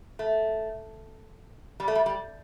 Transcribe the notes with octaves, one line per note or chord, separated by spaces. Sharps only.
A3
G3
A3
G3
G3